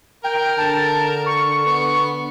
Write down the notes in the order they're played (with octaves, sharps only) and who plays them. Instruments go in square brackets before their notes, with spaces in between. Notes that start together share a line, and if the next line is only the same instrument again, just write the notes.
[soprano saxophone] A#4 [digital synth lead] G5
[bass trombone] D3 [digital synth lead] A5
[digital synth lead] C#6
[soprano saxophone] B3